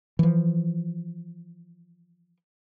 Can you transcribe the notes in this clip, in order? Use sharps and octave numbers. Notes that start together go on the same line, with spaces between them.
E3 F3